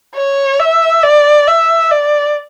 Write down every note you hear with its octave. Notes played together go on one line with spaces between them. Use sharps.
C#5
E5
D5
E5
D5